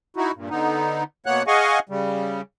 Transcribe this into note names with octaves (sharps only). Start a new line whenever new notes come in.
D#4 E4 F#4
G2 A#2
D3 B3 D#4
B2 A#3 B3 C#5 F#5 F#6
G#4 D#5 F5 F#5 G#5 C#6
C#3 G3